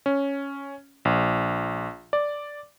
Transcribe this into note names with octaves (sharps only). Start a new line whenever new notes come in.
C#4
A#1
D5